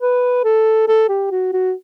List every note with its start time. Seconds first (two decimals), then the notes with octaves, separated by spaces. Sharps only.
0.01 B4
0.44 A4
0.88 A4
1.09 G4
1.31 F#4
1.53 F#4